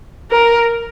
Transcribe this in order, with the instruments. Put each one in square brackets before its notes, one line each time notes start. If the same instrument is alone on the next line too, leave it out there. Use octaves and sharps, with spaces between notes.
[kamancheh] A#4